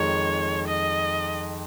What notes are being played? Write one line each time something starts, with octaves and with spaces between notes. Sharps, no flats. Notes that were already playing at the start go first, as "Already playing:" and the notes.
Already playing: F2 D#3 G#3 C#5
D#5